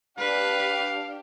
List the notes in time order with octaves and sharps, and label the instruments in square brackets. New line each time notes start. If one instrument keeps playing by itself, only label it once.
[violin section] D4 G4 [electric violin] B4 [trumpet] F5